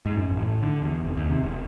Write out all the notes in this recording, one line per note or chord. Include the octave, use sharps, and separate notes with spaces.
G#2
F#2
A1
A2
D3
E2
F1
D#2
C3
E1